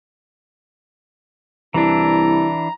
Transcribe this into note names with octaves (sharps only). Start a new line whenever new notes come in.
C2 E3 D4 E4 A#5